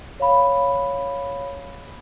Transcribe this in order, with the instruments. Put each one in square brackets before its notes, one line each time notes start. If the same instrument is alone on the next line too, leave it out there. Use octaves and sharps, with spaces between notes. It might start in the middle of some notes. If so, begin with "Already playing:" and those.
[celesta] C#5 F5 B5